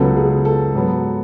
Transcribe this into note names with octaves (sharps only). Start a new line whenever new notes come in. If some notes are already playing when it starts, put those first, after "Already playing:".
Already playing: C#2 C#3 F#3 B3 A4
G#4
A4
G#2 F#3 B3